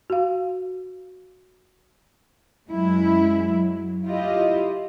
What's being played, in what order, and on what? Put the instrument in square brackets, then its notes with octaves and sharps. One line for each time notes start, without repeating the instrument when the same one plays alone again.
[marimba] F#4 F5
[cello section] F#2 F#3 G#3 E4
F#3
E4 F4 G4 D#5